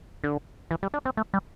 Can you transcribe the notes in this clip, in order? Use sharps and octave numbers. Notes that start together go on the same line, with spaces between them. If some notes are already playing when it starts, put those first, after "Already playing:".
D3
E3
G3
D4
C4
A3
G3